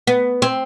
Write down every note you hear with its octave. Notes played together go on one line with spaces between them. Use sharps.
B3
C4